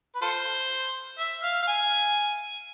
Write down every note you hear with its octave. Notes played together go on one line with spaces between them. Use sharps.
B4
F4 A4 C5
E5
F5
F5
G#5